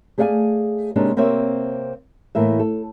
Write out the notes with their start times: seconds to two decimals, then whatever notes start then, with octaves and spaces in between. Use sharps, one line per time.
0.18 A3 G#4 D5 F5 F#5 G#5
0.96 C3 G#3 A#3 C#4 D4
1.17 C3 A#3 C4 C5 C#5 E5
2.35 A2 E3 A#3 E5
2.59 A4